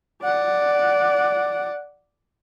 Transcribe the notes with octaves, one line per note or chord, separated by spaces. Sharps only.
D5 F#5